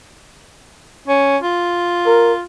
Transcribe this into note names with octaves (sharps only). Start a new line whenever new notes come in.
C#4
F4
A#4